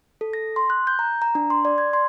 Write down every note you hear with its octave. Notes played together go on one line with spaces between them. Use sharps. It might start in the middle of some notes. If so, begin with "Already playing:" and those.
A4
A#6
C6
F#6
G6
A#5
A#5
D4
C6
D5
G#6
C6